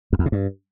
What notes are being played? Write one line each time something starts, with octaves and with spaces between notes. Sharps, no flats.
F2
E2
C3
G2